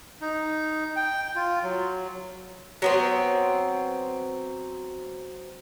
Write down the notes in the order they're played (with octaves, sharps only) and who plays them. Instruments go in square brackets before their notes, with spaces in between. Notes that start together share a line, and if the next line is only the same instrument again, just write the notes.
[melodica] D#4
G5
F4
F#3
[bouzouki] F#3 B3 C4